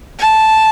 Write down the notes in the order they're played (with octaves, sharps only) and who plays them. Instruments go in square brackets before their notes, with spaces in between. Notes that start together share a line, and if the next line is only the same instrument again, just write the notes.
[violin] A5